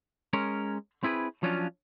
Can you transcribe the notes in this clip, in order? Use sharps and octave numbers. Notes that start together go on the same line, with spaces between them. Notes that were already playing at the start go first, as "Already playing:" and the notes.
G#3 C#4 A#4
C4 E4 G#4 A#4 B4
F3 F#3 C#4 D4 F4